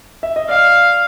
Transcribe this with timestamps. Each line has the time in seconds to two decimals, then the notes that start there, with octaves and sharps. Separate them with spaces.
0.23 E5
0.36 D#5
0.49 D5 F5